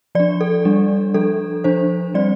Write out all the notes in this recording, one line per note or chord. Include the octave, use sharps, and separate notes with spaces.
F3 D4 D5
A4
G3 D4
F3 D4 A4
F3 D4 C5
G3 C4 D5